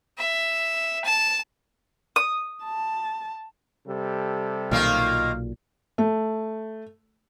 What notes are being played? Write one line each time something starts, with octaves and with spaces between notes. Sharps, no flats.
E5
A5
D#6
A5
C3 G3 A4
B1 A#2 D#3 A#3 F4 F5
A3